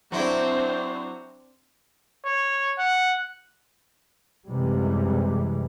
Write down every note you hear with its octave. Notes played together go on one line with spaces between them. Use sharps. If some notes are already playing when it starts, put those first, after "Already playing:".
F#3 C4 D4 E4 C5
C#5
F#5
F#2 C3 E3 G3 G#3